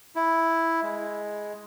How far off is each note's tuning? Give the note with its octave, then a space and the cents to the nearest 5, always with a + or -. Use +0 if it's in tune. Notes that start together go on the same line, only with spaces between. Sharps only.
E4 +0
G#3 +5